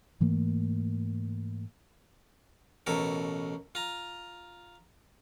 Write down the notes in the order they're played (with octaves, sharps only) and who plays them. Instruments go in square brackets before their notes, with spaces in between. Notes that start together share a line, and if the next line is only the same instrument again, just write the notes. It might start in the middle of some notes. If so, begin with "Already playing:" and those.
[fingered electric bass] G#2 E3 A3 A#3
[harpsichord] A1 B2 A4 A#4
F4 A#5